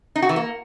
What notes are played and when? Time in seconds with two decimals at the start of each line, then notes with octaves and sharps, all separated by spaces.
0.16 D#4
0.22 F#4
0.29 E3
0.36 A#3